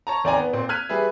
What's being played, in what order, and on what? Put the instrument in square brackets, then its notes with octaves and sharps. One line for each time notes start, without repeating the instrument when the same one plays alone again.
[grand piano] C#5 A5 A#5
G#1 C4 D5 G5 G#5 A#5
B3
A#2 C4
F6 F#6 G#6 B6 D#7
G3 G#4 B4 E5